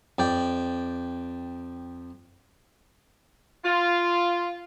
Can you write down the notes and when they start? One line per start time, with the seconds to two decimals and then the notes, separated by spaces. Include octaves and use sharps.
0.19 F2 D5 G5
3.64 F4